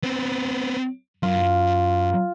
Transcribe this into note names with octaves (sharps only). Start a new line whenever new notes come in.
B3 C4
F#2 F4